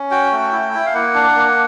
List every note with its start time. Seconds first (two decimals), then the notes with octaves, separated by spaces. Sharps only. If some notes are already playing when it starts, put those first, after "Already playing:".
Already playing: C#4
0.11 F#4 G5
0.32 A3
0.52 E4
0.73 E4
0.86 F5
0.94 A#3 F#5
1.15 D4
1.36 A#3